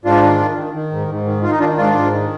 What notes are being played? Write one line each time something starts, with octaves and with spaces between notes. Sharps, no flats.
G#2 D4 F4
D#3
D#3
D#3
D#3
G#2
G#2
D#3
D#3 F4
D#4
D#3 D4 F4
G#2 D4 F4
G#2
D#3